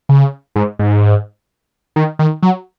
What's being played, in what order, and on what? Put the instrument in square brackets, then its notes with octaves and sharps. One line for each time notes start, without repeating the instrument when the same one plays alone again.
[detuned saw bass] C#3
G#2
G#2
D#3
D#3
F#3